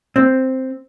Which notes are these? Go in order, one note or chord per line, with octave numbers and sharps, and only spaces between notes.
C4